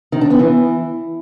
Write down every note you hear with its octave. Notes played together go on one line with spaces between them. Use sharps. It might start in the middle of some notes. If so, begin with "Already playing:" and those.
D#3
D4
B3
E3